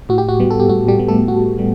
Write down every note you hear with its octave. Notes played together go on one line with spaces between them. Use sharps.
A2 F#4
G4
F#4
G3 B3
A4
G4
A2 F#4
G3 G4
G3 B3
A3 A4
A2 F#4
G3 B3